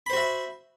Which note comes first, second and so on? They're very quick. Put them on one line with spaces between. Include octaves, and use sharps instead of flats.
B5 C5 F#4 E5